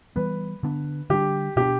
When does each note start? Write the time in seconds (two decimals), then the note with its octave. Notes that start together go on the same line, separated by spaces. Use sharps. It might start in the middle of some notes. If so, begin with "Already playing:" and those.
0.16 E3 G3 B3 B4
0.63 D3 B3 D4
1.10 D3 G3 D4 G4
1.56 B2 B3 D4 G4